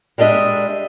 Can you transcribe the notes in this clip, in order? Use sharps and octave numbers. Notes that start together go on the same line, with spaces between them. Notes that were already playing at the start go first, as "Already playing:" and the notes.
G3 G#3 D4 D#5 E5